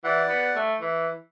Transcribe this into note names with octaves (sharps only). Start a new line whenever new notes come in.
E3 G4 D5 F#5
B3
A3
E3